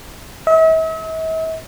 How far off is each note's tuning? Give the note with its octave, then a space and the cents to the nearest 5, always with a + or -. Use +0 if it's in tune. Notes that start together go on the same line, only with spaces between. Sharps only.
E5 -45